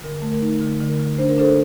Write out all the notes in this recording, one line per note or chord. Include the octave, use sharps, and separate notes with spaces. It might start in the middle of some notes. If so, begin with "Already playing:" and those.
D3 A#4
A3
A#4
D#4
D3 A#4
D3
A#4
D3
D4 C5
A#4
D4 A4 C5